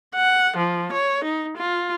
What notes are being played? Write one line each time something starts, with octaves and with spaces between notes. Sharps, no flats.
F#5
F3
C#5
D#4
F4